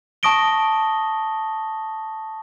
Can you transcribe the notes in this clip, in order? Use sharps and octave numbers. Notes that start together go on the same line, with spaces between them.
A5 C#6 D#6 A#6 D7 G7